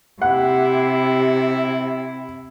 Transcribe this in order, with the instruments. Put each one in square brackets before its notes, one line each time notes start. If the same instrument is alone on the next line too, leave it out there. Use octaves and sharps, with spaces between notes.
[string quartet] C3 [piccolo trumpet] E4 [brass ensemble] G4 [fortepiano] F#5